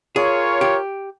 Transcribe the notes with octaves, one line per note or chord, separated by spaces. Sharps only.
F4 G#4 A#4 C#5
G4